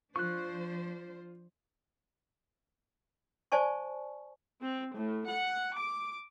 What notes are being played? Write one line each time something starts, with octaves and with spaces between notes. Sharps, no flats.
F3 D4 F4 C5 C#6 F#6
C5 D5 G#5 A5 C#6
C4
A2
F#5
D6